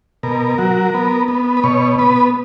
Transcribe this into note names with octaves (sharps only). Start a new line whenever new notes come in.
B2 A#4
F#3
B3
B3
B4
B2 C#5
B3 B4